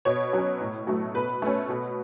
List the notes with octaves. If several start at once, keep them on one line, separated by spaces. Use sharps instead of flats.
B2 C#5
F#3 C#4
A2
F#3 A3
B2 B4
A3 C#4
B2